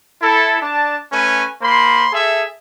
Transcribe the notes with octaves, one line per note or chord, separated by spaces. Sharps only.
E4 A4
D4 D5 A5
A3 C#4 B4 C#5 G#5
A#3 C5 B5 C6
G#4 A4 E5